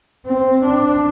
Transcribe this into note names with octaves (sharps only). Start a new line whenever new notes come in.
C4
D4